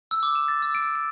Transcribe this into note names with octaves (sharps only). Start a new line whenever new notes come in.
E6
D6
E7
A6
E6
D7
D7